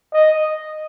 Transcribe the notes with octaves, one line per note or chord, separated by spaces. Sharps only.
D#5